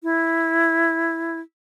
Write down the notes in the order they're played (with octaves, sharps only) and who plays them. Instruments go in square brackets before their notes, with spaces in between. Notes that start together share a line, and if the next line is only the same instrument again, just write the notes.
[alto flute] E4